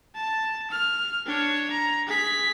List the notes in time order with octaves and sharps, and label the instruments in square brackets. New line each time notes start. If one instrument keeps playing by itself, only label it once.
[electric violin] A5
F6
D4 C#5
A#5
G#4 B6